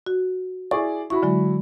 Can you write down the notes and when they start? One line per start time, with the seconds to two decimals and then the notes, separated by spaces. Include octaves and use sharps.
0.06 F#4
0.71 E4 G#4 D5 C#6
1.10 E4 F#4 B5 C#6
1.23 D3 F#3 G#3